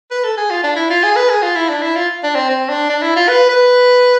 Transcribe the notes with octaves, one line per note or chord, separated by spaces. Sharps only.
B4
A4
G#4
F4
D4
E4
F4
G#4
B4
G#4
F4
E4
D4
E4
F4
D4
C4
C4
D4
D4
E4
F4
B4
B4